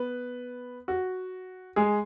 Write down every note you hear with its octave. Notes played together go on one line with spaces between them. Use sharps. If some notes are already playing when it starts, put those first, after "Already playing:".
Already playing: B3 B4
F#4
G#3 G#4